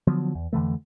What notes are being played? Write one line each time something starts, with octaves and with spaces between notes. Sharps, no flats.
D3 F3 F#3 B3
E2
F2 D3 E3 A3